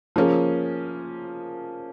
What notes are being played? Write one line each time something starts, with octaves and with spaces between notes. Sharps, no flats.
F3 A#3 C#4 G#4